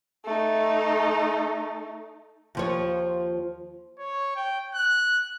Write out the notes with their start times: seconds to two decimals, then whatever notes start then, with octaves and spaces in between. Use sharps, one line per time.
0.25 A3 D#4
2.55 D#2 F3 C#5
3.98 C#5
4.36 G5
4.74 F#6